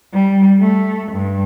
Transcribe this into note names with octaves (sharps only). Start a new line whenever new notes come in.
G3
A3
G2